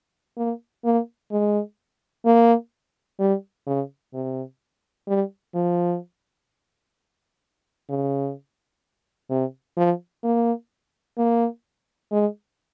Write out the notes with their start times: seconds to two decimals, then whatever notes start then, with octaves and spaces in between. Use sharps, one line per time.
0.37 A#3
0.85 A#3
1.32 G#3
2.26 A#3
3.19 G3
3.67 C#3
4.14 C3
5.08 G3
5.55 F3
7.90 C#3
9.30 C3
9.77 F3
10.24 A#3
11.18 A#3
12.12 G#3